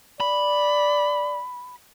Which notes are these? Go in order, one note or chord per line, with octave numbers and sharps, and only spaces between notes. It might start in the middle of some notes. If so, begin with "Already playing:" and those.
D5 B5